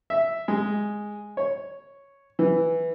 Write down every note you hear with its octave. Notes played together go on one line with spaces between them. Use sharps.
E5
G#3
C#5
E3